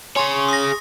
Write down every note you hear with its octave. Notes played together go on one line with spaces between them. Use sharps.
G#4 C#5 G#5 C6 C#6
D#6 A#6